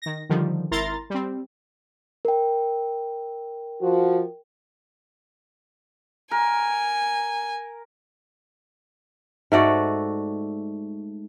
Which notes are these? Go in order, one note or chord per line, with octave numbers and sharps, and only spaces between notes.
D#3 A#6
D3 D#3 F3 G3
G#1 E4 A#4 A#5 C6 A6
G3 C4
A#4 G5
F3 F#4
A#4 G#5
G#2 A3 F#4 D5